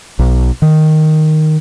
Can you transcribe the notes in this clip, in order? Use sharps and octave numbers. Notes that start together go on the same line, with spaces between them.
B1
D#3